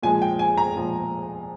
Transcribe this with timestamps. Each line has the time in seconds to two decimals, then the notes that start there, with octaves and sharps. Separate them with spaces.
0.03 A#2 F3 G#3 G#5
0.22 G5
0.39 G#5
0.58 A#5
0.75 A#2 F3 G#3